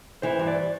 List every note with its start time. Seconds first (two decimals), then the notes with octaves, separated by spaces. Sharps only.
0.22 E3 C5
0.39 G2
0.47 D5